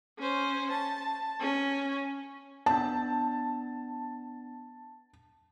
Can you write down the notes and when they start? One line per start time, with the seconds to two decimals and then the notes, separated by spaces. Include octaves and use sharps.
0.19 C#4 C5
0.71 A5
1.40 C#4
2.66 B3 D4 A5